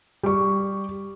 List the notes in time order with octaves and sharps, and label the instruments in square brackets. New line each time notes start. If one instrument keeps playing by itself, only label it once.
[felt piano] G3 C#6